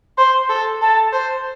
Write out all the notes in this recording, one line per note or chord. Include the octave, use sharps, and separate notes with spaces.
C5 C6
A4
A4 A5
C5